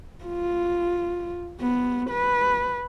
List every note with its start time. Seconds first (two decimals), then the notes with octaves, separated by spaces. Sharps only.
0.24 F4
1.60 B3
2.10 B4